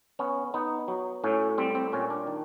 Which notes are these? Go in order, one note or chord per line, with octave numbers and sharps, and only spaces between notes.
B3 C#4
B3 D#4
F#3
A2 C#4
G3 C4
C4
A#2 C#4
D4
D#3